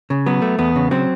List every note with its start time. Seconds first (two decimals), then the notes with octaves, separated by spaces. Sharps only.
0.10 C#3
0.26 F#3 B3
0.42 A3
0.58 E2 B3
0.76 C#3
0.91 F#3 C4